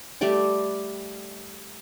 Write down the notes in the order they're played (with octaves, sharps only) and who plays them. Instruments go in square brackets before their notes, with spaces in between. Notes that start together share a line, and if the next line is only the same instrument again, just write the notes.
[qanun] G3 A3 G4 D5